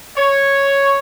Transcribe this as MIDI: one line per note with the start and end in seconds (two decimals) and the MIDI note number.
0.16 0.98 73